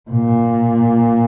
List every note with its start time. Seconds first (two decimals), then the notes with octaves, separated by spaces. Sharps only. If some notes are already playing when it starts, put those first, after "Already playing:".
0.10 A#2